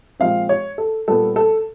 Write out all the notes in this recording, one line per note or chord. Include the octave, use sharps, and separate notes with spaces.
A#2 F3 G#3 C4 F5
C#5
A4
A#2 G3 B3 A4
A4